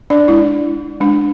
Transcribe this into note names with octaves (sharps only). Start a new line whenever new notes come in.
D4 D5
G#3 D4 E4
G#3 D4